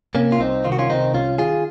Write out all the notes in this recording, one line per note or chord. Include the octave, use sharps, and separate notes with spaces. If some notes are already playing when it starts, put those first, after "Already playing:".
C3 A#3 C#4
F4
C2 C4 D#4
D#3 F4
F#4
C#4 F4
C3 C4 D#4
C2 C#4 F4
D#3 F4 G#4